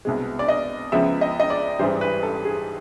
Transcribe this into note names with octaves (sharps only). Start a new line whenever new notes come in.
C2 B2 G#3
D5
D#5
C#2 C#3 F3 G#3 B3 E5
D#5
D#5
D5
A1 G#2 E3 G3 C5
B4
A4
G#4